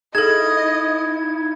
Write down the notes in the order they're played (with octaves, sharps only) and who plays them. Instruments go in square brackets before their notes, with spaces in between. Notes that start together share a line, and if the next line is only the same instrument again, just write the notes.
[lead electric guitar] D#4 E4 [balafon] G#4 A4 [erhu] D#5 [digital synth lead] G#6